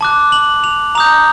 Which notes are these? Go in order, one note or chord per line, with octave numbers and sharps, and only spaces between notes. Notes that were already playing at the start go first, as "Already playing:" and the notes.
A5 D6 F#6
F#7
F7
A#5 D#6 G6 F7